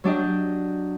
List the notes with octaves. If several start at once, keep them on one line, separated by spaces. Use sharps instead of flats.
F#3 D4 G4 D#5